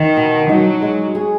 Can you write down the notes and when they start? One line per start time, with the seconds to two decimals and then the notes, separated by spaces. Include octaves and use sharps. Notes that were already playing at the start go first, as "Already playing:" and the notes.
Already playing: D#3
0.17 B2
0.49 F#3 D#4
0.82 G#3
1.15 G#4